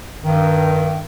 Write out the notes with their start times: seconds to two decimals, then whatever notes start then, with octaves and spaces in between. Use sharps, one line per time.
0.24 G2 D#3